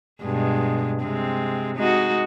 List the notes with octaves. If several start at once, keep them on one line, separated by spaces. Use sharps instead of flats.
G2 B2 G#3
C3 G#3 C4
G#3 D#4 F#4